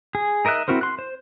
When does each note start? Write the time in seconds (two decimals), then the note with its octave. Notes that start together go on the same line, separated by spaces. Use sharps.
0.15 G#4
0.45 D#4 A#4 D#5 E5 F#6
0.68 C4 E4 F#4 A#4 C5
0.81 C6 F#6
0.99 C5